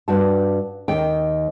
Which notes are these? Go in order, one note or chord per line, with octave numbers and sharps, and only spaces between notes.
G2 F#4 A5
D#2 G5